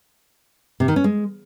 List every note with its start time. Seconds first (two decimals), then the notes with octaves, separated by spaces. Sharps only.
0.80 C3
0.88 D#3
0.96 C#4
1.04 G#3